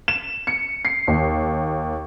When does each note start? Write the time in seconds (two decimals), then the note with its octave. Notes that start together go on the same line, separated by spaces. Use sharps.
0.08 E7
0.47 C#7
0.85 C7
1.08 D#2